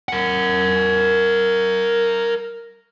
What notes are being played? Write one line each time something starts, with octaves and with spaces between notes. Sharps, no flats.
A#4 F#5